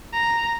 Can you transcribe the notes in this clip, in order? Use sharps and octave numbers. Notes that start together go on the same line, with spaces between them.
A#5